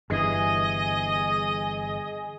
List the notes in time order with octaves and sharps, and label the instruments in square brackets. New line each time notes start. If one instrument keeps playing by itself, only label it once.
[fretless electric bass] G1 G2 E3 [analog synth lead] G#4 [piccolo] D#5